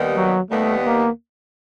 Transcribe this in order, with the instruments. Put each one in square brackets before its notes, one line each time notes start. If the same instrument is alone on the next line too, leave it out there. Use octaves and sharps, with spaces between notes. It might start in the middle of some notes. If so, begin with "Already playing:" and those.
Already playing: [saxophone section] D#2 D#3 G3 B3
[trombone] F#3
[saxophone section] D#2 D#3 G3 B3 [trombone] A3
[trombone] A#3